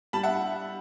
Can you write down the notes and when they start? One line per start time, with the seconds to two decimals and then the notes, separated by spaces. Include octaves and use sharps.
0.13 G3 A5 B5
0.23 E5 F#5